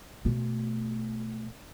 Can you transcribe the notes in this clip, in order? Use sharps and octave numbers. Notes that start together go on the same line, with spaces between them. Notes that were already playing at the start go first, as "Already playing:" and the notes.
B2 A3